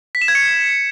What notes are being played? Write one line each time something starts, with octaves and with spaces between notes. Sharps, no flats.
B6
E7
G#6
C#7